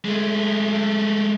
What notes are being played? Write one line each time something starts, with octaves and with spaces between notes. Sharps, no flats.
G#3 A3